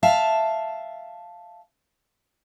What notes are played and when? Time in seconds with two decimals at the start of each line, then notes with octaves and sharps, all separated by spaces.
0.03 E5 F5 A5